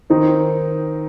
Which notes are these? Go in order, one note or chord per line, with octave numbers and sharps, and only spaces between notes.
D#3 C4 D#4